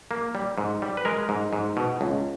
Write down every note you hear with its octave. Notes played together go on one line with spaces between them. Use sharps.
A#3
G3
G#2
G3
B4
G#3 A#4
G#2
G#2
B2
C#2